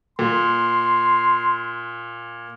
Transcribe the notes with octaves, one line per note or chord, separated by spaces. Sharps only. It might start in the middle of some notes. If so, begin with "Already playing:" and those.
A#2 C6